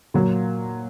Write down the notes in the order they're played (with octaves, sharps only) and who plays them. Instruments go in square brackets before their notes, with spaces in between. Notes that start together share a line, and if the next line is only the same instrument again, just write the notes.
[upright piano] A#2 F#3 A#3